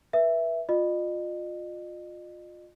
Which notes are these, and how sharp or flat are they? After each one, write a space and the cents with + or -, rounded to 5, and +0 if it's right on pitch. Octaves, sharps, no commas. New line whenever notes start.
B4 -30 E5 +0
F4 +20 D#5 -40